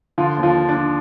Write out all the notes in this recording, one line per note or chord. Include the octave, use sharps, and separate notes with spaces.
D3 F3 F4
D#2
F3 F4
D3
D4
F3